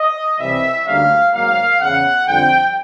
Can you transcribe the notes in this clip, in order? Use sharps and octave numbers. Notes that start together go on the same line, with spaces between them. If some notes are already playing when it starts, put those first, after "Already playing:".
Already playing: D#5
C2 C3 E3 G3 E5
D2 D3 G3 A#3 C#4 F5
G#2 D#3 F#3 A#3 F5
E2 C#3 E3 F#5
F2 D3 G3 G5